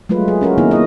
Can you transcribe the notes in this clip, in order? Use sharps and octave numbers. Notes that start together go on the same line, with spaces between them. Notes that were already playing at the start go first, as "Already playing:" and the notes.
F#3 G#3 A3 F4 B4
G#4
C#4 F#4 A#4
D#3 A#3 B3 D#4 E4
A#3 F4 D#5